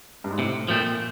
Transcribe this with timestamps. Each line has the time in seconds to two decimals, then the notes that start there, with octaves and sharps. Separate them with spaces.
0.24 G2
0.31 G#2
0.38 A2 C3
0.68 A#2 F3 A3 C4